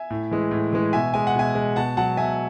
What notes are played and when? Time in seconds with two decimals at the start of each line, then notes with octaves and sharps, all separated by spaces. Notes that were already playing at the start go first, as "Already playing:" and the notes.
Already playing: E5 G#5
0.10 A2
0.31 E3 G#3
0.51 A2
0.73 E3 G#3
0.93 B2 E5 G#5
1.14 G#3 G#5
1.27 F#5
1.35 B2 E5 G#5
1.55 G#3
1.76 B2 F#5 A5
1.97 F#3 F#5 A5
2.17 B2 E5 G#5